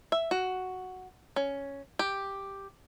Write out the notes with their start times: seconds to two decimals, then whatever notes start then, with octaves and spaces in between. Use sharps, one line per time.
0.12 E5
0.31 F#4
1.36 C#4
1.99 G4